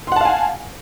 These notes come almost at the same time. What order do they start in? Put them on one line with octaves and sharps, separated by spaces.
C6 F#5 A5 F5 G#5